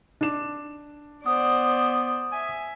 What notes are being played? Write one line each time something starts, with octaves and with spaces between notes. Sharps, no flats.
D4 E7
B3 C5 D5 D#6
E5 G#5